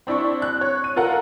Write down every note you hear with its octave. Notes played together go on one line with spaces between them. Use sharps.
C4 D4 E4 D5 C#6
F#6
C#5
D#7
F4 A4 A#4 F#5